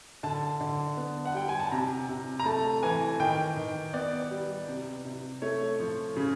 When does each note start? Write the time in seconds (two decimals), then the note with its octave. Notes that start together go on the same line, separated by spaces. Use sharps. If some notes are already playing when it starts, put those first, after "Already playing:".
0.23 D3 A5
0.60 D3
0.97 B3
1.25 F#5
1.34 G3 G5
1.49 G#5
1.60 A5
1.72 C3 A#5
2.09 C3
2.40 A#5
2.46 A3 A5
2.83 E3 G#5
3.20 D#3 G5
3.57 D#3
3.93 B3 D5
4.31 G3
4.68 C3
5.05 C3
5.42 A3 C#5
5.80 F3
6.16 C#3